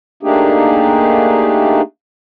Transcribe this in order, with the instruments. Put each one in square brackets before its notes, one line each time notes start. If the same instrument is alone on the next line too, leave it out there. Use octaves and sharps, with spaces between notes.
[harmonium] A3 A#3 D4 D#4 G4 G#4